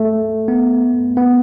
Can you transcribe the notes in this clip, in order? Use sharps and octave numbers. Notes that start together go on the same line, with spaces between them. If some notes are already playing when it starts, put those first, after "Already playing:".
Already playing: A3
B3
B3